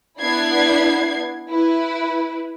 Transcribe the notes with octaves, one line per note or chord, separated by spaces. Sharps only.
B3 D4 E4 G#6 C7
E4 B4